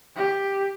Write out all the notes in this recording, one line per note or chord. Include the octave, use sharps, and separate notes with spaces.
G4